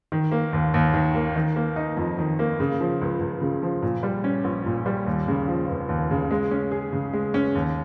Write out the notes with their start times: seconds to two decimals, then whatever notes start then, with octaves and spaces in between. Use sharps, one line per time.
0.12 D#3
0.32 A#3
0.53 D#2
0.74 D#2
0.94 D#3
1.15 A#3
1.36 D#3
1.56 A#3
1.76 D#4
1.97 F2
2.18 D#3
2.39 A#3
2.60 C#3
2.80 F3
3.01 C#2
3.20 C#2
3.42 C#3
3.62 F3
3.82 A#2
4.03 G3
4.24 C#4
4.44 A#1
4.66 A#2
4.86 G3
5.06 D#2
5.28 C#3
5.48 F3
5.68 F1
5.89 D#2
6.11 C#3
6.31 G#3
6.51 C#4
6.71 G#4
6.93 C#3
7.13 G#3
7.34 C#4
7.55 D#2